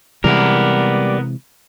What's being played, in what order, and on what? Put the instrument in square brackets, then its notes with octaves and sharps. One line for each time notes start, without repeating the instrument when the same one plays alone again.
[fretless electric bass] C3 E3 G#3 [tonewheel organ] G3 D5 [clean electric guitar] B3 A#4